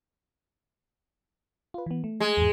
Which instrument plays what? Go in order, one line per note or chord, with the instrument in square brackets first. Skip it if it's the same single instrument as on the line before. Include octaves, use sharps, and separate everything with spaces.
[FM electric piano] F4 B4
E3 B3
A3
[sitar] G#3
[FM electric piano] E2 G#2